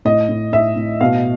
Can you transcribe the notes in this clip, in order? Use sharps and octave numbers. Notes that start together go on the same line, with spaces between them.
A2 D#5
A2
A2 E5
A2
B2 F5